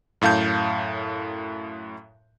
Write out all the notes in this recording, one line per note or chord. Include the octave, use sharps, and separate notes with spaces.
F#2 A2 F5 A5 G6